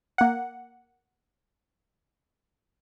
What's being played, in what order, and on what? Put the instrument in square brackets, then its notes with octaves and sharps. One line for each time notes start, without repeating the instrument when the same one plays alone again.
[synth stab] A#3 F#5